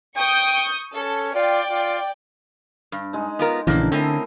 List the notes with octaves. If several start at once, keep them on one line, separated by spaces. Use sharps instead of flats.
G5 C#6 D#6 G6
C#4 A4
F4 D5 G5
F4
G2
G#3 D#4
B3 F4 A#4
A#1 A2 C#3 E3 A#3 D4
D3 A3 C4 C#4 E4 A#4 D#5